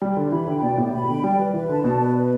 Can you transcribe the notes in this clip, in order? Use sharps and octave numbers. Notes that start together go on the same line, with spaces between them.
G3 D5
D3 G4
E3 B5
D3 G5
B2 D5
A2 G4
B2 B5
D3 G5
G3 D5
G3 B4
E3 B4
D3 A5
B2 D5
B4
B4